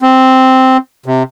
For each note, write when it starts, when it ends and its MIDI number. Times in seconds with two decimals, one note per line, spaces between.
0.02 0.77 60
1.06 1.23 48